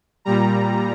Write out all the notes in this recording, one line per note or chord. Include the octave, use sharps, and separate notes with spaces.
A#2 G3 A#5